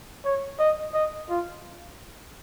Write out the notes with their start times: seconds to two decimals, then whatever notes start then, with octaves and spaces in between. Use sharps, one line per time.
0.25 C#5
0.59 D#5
0.94 D#5
1.29 F4